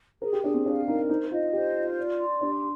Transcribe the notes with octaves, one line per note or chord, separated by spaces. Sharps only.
G#4 A#4
G4
D4 G#4
C4
D4 F5
D#4 A#4
D#4 C5
F4 D#5
G4 C5
F4
D5
C6
D4 G4